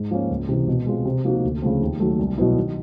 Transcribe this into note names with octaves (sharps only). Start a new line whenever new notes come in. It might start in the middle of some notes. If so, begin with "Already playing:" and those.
Already playing: G#2
F3 A#3 C#4
C#2
C3 E3
B2
G#3 C4 F4
C3
F3 A#3 D#4 F#4
D2
C#3 F3 A3 C4
D#2
D#3 F#3 A3
C2
B2 F#3 B3 E4
D#3